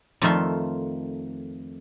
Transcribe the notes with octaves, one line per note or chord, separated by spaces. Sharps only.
F2 D#3 A3 F4 E5